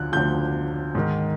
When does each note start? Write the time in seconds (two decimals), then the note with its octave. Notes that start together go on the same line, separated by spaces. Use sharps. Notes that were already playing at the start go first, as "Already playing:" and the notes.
Already playing: D2 D3 F3 F#6
0.12 D2 D3 F3 G6
0.95 G#2 D#3